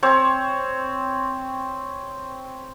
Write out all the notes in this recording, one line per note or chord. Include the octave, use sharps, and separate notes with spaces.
C4 C5 C#5